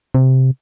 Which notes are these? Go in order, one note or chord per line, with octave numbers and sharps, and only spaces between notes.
C3